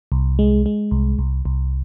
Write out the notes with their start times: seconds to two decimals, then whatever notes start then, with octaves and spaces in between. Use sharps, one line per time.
0.12 C2
0.39 G#3
0.66 G#3
0.91 C2
1.19 C2
1.45 C2